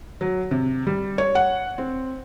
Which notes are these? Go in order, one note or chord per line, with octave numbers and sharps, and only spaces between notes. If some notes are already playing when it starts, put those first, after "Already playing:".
F#3
C3
G3
C#5
F#5
C4